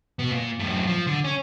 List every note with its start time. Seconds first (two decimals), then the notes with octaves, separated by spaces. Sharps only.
0.19 B2 B3
0.32 A#2
0.59 F#2 A2
0.87 F3
1.07 D3
1.24 C#4